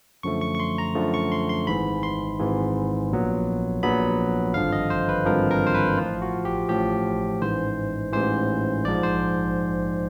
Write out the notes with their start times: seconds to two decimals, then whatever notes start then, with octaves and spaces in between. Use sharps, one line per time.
0.23 F#2 D3 F3 A3 C#6
0.41 C#6
0.55 C#6
0.60 C6
0.78 A#5
0.95 F#2 D3 F3 A3
1.14 C#6
1.32 C6
1.49 C6
1.67 G#1 G#2 E3 B5
2.03 C6
2.39 G#1 G#2 E3
3.10 A#1 A#2 F#3 B3
3.83 A#1 A#2 F#3 B3 B5
4.54 G#1 G2 D3 F3 F5
4.72 D#5
4.90 C5
5.09 B4
5.26 G#1 G2 D3 F3 A#4
5.51 A#4
5.67 C5
5.74 B4
5.97 A1 A2 F3 F4
6.22 F#4
6.45 G4
6.69 A1 A2 F3 G4
7.41 A1 G#2 E3 C5
8.12 A1 G#2 E3 C5
8.85 A#1 G#2 F3 D5
9.03 C5